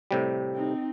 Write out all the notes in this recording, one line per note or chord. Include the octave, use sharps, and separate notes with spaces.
A2 C3 G3
C4 D#4